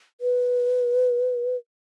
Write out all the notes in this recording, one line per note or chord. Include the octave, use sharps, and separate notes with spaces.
B4